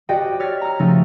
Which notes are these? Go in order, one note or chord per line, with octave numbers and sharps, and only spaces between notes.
F#4 G4 C5 D5 D#5 G5
C#5 F6 A6 B6
A#5 F6
C#3 F3 A3 D#4